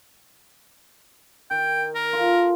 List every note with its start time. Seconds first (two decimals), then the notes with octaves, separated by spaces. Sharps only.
1.51 D#3 G5
1.95 A#4
2.13 F4 A4